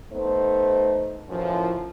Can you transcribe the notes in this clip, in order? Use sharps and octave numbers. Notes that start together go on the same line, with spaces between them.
A3 B3 D#4 C5
F#2 A2 E3 F3